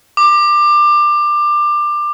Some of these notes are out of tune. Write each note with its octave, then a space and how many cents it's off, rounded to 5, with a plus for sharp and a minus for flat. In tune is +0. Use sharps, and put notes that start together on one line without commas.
D6 +20